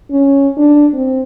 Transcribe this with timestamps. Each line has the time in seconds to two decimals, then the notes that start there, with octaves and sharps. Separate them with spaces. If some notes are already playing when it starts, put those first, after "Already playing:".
0.11 C#4
0.57 D4
0.94 C4